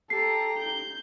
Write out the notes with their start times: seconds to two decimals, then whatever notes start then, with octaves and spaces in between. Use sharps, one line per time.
0.10 G4 A4 A#5 C7
0.58 G6